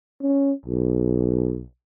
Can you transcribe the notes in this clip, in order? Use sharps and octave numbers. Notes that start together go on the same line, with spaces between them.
C#4
B1